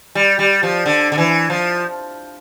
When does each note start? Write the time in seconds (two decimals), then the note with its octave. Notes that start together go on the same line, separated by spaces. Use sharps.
0.15 G3
0.39 G3
0.63 F3
0.86 D3
1.12 D3
1.18 E3
1.50 F3